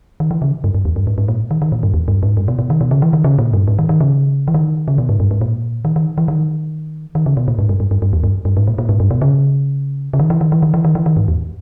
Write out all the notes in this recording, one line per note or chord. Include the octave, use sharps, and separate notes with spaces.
D#3
E3
C#3
G2
G2
E2
G2
G#2
G#2
A#2
D#3
D#3
A#2
G2
E2
G2
G#2
G2
B2
B2
D#3
B2
C#3
E3
D#3
C#3
A#2
G2
G#2
D#3
D#3
C#3
E3
D#3
C#3
B2
G#2
G2
G#2
A#2
D#3
D#3
E3
D#3
D#3
C#3
B2
A#2
G#2
G2
G2
G2
G2
E2
G2
G2
G#2
A#2
A#2
G#2
G2
B2
C#3
C#3
D#3
E3
D#3
E3
D#3
E3
D#3
E3
D#3
G#2
E2